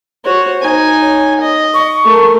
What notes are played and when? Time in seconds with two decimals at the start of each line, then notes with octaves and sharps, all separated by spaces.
0.25 F#4 C5 C#5
0.61 D#4 G#5
1.01 C#5
1.41 D#5
1.74 C#6
2.04 A3 A#4